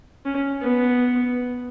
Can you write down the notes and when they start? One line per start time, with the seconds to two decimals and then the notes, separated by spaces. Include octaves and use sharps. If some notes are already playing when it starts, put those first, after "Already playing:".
0.25 C#4
0.62 B3